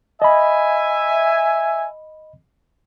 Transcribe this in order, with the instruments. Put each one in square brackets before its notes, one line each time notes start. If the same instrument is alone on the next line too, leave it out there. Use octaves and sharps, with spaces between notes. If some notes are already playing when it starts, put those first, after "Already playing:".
[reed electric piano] D#5 B5 [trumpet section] E5 G#5